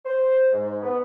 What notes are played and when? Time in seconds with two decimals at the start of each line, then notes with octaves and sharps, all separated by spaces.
0.05 C5
0.52 G#2
0.83 B3